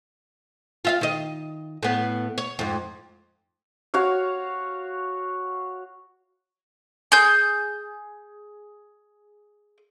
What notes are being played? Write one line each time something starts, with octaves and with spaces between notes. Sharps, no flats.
F4 E5 F5
D#3 D#5
A2 B3
C#5
F2 G#2
F#4 C#5 F5
G#4 G6